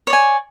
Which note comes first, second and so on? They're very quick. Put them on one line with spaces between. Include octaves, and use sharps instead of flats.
C#5 D5 G#5